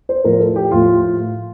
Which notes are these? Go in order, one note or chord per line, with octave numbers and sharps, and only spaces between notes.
C5
A2 F3 A#4
A4
G4
A2 F3 F4